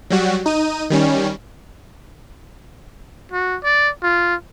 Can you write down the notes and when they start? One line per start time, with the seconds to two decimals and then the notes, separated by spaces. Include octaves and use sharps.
0.10 F#3 G3 F#4
0.46 D#4 D#7
0.90 D#3 G3 C#4
3.32 F#4
3.63 D5
4.03 F4